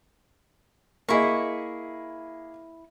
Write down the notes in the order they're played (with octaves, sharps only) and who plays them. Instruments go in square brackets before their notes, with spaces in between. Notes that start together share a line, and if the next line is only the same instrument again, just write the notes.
[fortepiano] A#3 G#4 D#5 [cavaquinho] E4 C#6